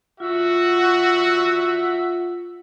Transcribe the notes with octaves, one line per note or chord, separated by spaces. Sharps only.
F4 F#4 E5 F#5